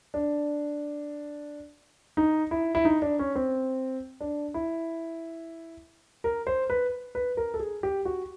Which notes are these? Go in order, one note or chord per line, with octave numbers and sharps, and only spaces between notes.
D4
D#4
E4
E4
D#4
D4
C#4
C4
D4
E4
A#4
C5
B4
B4
A#4
A4
G#4
G4
F#4